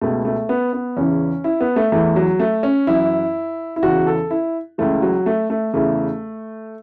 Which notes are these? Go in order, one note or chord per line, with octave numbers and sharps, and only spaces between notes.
C#2 B2 A3
A3
B3
B3
E2 C#3 E3 C#4
E4
B3
A3
E2 E3 A3
F#3
A3
C#4
F#2 E3 E4
E4
E2 C#3 E3 F#4
A4
E4
C#2 C#3 E3 A3
F#3
A3
A3
E2 C#3 E3 A3